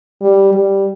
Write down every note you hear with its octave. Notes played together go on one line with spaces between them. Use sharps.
G3
G3